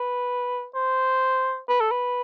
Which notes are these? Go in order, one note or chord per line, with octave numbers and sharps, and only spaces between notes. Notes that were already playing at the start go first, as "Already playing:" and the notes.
Already playing: B4
C5
B4
A4
B4